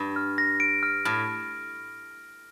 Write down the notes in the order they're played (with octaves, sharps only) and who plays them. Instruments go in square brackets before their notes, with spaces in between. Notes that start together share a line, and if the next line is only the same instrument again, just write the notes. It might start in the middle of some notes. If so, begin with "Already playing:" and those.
Already playing: [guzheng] G2
[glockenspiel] F6
A#6
D7
F6
[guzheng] A2 [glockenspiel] F6